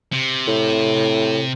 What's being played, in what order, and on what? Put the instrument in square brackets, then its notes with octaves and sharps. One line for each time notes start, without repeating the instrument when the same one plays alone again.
[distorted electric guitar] C3
[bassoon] A2